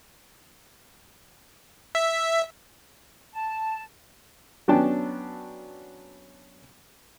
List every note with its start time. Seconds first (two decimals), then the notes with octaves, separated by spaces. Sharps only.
1.95 E5
3.34 A5
4.68 F#3 B3 C#4 D4 G5 A5